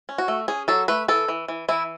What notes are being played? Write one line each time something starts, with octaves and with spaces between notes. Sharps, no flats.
C#4
F#4
A3
C#4 G#4
F#3 A4
A3 B4
E3 A4
E3
E3
E3 E4